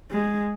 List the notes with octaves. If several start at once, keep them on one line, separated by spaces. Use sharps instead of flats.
G#3